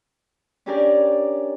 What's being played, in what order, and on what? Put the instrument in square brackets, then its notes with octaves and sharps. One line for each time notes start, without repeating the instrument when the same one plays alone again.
[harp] C#4 D4 G4 G#4 A#4 D5